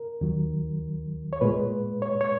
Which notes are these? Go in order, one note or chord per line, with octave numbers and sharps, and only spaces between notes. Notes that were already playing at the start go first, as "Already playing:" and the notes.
Already playing: A#4
D#2 D#3 F#3
C#5
A#2 G#3 B4
C#5
C#5